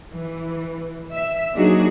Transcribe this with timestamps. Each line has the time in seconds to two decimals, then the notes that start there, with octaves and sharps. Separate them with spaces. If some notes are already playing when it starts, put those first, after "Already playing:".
0.12 E3
1.12 E5
1.55 F#3 A#3 D4 D#4 F#4 G#4